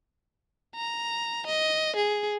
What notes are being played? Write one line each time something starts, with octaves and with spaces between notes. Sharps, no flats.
A#5
D#5
G#4